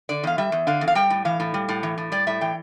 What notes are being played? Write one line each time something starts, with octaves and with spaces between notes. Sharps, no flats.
D3 D5
E2 F5
G3 E5
E2
D3 F5
E2
F5
G3 G5
A2
E3 F5
A2
G3
A2
E3
A2
G3 D5
A2 E5
E3 G5